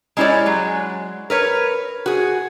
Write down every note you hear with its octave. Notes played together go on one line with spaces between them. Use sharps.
G#3 C#4 E4 G4 C#5 D5
F#3 G#3
A#4 B4 C#5
F#4 G#4